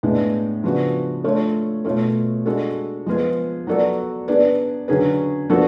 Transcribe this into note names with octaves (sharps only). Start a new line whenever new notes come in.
A2 G#3 B3 D4
C#3 F3 B3 D4 F#4
A3 D4 F4 A4 C#5
B2 A3 F4 A4 C#5
G#3 D4 F#4 A4
F3 G#3 B3 F4 G#4
F#3 B3 F#4 A4 D5
B3 D4 G#4 B4 D5
D3 F#3 C#4 G#4 B4
F3 B3 D4 F#4 A4